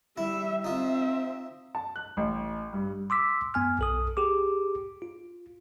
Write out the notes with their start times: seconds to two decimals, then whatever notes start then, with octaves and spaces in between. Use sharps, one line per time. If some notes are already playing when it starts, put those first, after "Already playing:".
0.17 G3 E4 E5
0.64 C4 D#4 F4 E5
1.75 A5
1.96 F#6
2.17 A1
2.73 G2
3.10 C6 D6 E6 B6
3.54 F#2 B3 G#5 F6
3.79 B1 A4 D#6
4.17 G4 G#4 D6
5.02 F4